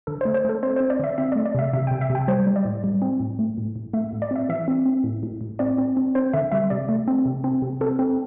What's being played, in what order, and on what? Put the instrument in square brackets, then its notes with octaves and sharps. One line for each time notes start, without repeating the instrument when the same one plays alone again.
[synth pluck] D3 A4
C5
A3
C5
A3 A4
C4 C5
C5
C4
D5
D3 E5
C4 E5
D5
A3
D5
C3 E5
C3 E5
G5
C3
E5
C3
G5
G3 C5
G3
D5
A2
G3
C4
A2
A3
A2
A2
A3 E5
A2
D5
C4 E5
E3 E5
C4
C4
A2
A2
A2
C4 D5
C4
C4
C4 C5
D3 E5
G3 E5
C3 D5
A3
C4
C3
C4
C3
C4 A4
C4